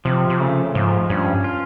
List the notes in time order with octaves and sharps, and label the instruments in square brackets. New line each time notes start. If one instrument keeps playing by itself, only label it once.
[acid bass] C3 [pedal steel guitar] F3
[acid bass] C3
[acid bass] C#3 [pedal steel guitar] A3
[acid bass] G#2 [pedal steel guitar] F3
[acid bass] G2 [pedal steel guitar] C#4
[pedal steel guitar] F4